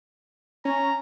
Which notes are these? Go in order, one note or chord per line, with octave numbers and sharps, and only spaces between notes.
C#4 A#5